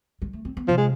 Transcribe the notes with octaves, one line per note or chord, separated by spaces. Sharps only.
G#3
A3
C4
B3
C3 F3
G#3